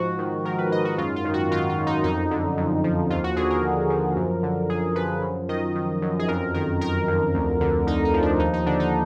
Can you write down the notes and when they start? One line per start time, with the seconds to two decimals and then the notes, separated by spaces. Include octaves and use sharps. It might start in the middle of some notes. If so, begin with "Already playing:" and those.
Already playing: G#2 F3 F#4
0.19 D#3
0.45 D#3 A#4
0.58 B4
0.71 G#2 D#5
0.85 F#4
0.98 F#2 F4
1.16 F4
1.25 D#3
1.34 F#4
1.51 D#3 F4
1.69 F4
1.78 F#2
1.87 D#4
2.04 F2 D#4
2.31 D3
2.57 F2
2.84 F3
3.10 D#2 F4
3.24 F#4
3.36 D3 G#4
3.50 A#4
3.63 D#2
3.90 F3
4.16 F#2
4.43 D3
4.69 F#2 G#4
4.95 F3 B4
5.22 F#2
5.49 D#3 D#5
5.75 D#3
6.02 F#2
6.19 G#4
6.28 F2 A#4
6.54 D#3 A#4
6.81 D#3 A#4
7.08 F2
7.35 D2
7.61 D3
7.87 D2 D#4
8.05 D#4
8.14 F3
8.22 D4
8.40 D#2 D#4
8.53 D#4
8.66 D3 D4
8.80 D#4